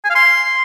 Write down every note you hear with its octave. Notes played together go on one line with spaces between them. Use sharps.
G#5
F5
C6